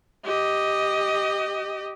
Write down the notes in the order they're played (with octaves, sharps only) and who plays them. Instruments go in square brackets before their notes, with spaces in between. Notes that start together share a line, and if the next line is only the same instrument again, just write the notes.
[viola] G4 D#5